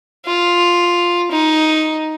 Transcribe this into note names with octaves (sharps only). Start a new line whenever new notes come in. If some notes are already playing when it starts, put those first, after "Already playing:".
F4
D#4